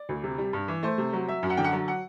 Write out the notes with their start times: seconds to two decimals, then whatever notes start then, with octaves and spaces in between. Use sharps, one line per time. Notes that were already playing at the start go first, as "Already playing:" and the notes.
Already playing: D5
0.09 D2
0.23 C3
0.38 G3
0.53 G2
0.68 E3
0.83 A3 C5
0.98 C3
1.13 F#3
1.28 F#3 E5
1.43 F#2
1.50 F#5
1.57 D3 G5
1.64 F#5
1.73 F#3
1.88 F#5